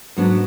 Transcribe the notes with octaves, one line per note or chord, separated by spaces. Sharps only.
G#2 F#3 B3 D4